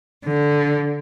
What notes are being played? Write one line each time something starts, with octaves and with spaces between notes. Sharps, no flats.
D3